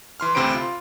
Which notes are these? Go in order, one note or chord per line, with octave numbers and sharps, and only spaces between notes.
E3 C6 F6
D2 C3 C4 C5 B5 D7
F4